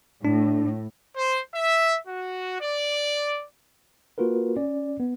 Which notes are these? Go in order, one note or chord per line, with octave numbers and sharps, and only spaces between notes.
A2 D4
C5
E5
F#4
D5
A#3 F4 F#4 A#4 B4
C#4 D5
B3